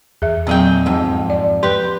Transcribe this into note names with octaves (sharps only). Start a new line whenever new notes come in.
E2 G#4 E5
A#2 F#3 C4 G#4 G5
F2 G#2
D5
G4 B4 C6 G6